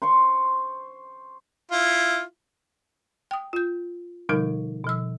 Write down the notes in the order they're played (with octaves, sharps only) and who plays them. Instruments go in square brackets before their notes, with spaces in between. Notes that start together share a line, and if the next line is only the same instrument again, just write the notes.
[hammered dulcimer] C5 C6 C#6
[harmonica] E4 F4
[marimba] G5 D#6
F4 G6
B2 D3 F3 G3 D#4 A#4
B2 F3 E6